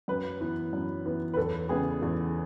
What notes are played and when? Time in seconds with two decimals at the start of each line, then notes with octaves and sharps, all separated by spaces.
0.08 F#2 B4
0.41 E3 B3
0.73 F#2
1.06 E3 B3
1.34 B4
1.37 E2 A4
1.69 C#3 G#3 B3 G#4
2.02 E2